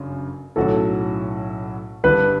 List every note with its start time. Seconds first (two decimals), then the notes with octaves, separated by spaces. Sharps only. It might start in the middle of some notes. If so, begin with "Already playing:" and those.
Already playing: G1 F#2 C#3
0.56 B1 A2 F#3 C#4 F#4 A4
2.04 G1 G2 D3 G3 D4 B4